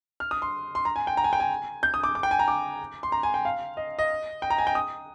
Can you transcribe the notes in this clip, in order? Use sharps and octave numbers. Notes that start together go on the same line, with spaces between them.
F6
D#6
C6
C6
A#5
G#5
G5
A#5
G#5
G5
G#5
G6
D#6
D6
D6
G5
G#5
A#5
D6
C6
A#5
G#5
G5
F5
D#5
D#5
G5
A#5
G#5
G5
D#6